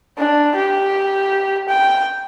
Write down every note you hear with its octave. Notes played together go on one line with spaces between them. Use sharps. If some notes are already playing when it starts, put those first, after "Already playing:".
D4
G4
G5